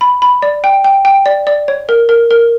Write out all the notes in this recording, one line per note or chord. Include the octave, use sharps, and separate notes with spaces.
B5
B5
D5
G5
G5
G5
D5
D5
C#5
A#4
A#4
A#4